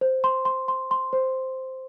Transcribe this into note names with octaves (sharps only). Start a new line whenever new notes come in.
C5
C6
C6
C6
C6
C5